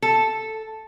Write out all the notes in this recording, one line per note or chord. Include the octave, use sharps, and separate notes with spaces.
A4